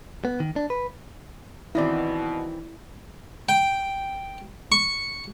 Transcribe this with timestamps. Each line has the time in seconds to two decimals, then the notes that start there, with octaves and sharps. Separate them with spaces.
0.25 B3
0.40 D#3
0.56 D4
0.70 B4
1.75 B2 D#3 E3 C4 E4 D5
3.49 G5
4.72 C#6